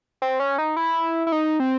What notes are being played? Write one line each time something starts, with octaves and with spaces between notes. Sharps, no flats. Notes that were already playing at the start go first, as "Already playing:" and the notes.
C4
C#4
D#4
E4
E4
D#4
C4